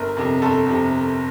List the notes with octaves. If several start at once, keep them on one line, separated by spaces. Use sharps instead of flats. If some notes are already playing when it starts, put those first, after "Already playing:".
Already playing: G1 A#4
F2 C3
G1 A4
F2 C3